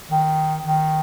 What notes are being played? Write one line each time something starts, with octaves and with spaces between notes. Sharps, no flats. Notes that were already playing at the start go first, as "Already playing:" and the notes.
D#3
D#3